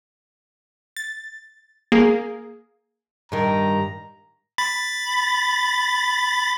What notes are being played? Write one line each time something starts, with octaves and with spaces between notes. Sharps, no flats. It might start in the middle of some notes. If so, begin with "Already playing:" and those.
A6
A#3 G#4
G2 D#3 A#5
B5 A6